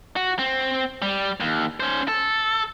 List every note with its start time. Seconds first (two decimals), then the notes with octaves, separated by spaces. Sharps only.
0.16 F#4
0.39 C4
1.02 G3
1.40 D#2
1.80 C#4 C5
2.08 A4